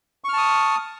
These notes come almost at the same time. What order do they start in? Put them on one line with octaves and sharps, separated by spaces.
C#6 F6 A5 D#6